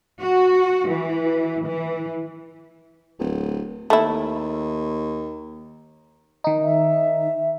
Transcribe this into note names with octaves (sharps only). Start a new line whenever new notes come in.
F#4
E3
E3
D1
D#2 A3 E4
D#3 D#4
E5